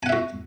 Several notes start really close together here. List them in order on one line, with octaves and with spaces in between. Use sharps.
G#5 F#5 E5 F#4